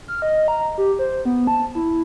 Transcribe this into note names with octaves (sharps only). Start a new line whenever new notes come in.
F6
D#5
A#5
G4
C5
B3
A5
E4